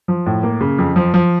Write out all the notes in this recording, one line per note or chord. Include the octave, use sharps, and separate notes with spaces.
F3
A2
A#3
C#3
F2
F3
F3